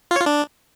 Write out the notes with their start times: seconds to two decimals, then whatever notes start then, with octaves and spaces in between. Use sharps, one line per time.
0.11 F4
0.16 C#5
0.21 F4
0.26 D4